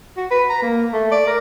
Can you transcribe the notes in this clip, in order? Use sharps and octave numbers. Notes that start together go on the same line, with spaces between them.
F#4
B4
A#5
A#3
A3
D5
A#4